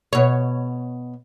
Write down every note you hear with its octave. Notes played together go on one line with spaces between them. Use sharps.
B2 C#5